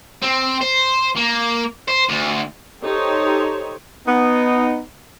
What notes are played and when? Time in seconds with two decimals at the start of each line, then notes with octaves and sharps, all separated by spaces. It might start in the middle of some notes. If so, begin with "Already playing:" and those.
0.22 C4
0.61 C5
1.16 A#3
1.88 C5
2.09 D2
2.82 D#4 G4 A4 C5 C#5
4.07 B3 D#4